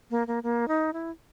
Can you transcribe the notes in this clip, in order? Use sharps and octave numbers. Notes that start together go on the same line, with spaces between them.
A#3
A#3
A#3
D#4
E4